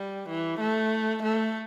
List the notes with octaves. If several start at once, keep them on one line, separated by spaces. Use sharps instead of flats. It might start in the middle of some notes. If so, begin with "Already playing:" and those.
Already playing: G3
E3
A3
A3